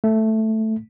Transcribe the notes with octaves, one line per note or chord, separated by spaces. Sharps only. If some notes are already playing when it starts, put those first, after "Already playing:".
A3